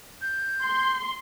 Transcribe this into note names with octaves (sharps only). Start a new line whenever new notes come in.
G6
C6